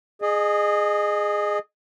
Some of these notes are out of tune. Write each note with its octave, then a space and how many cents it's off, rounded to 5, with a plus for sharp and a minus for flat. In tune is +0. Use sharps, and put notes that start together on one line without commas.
G#4 +0 D#5 -30